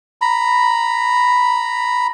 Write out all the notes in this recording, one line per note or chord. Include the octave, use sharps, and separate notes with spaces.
A#5 B5